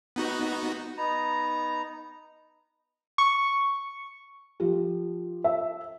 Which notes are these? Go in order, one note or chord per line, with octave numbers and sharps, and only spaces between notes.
B3 D#4 F#4
B3 D#4 A#5
C#6
F3 F4 G4
E5